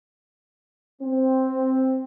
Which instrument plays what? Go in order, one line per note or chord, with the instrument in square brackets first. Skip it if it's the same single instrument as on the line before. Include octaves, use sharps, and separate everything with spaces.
[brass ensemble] C4